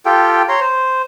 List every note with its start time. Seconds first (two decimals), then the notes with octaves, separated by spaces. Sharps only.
0.06 F4 G4 A4 G5
0.49 C#5 A#5 C6
0.60 C5